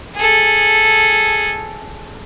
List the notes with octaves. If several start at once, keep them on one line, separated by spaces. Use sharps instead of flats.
G#4 A4